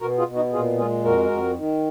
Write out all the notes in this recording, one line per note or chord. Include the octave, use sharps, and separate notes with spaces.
B2 F#4 A#4
F4 G#4
B2
D#4 F#4
A#2 F4 G#4
G#3 F4 G#4
F2 F#4 A#4
F2
D#3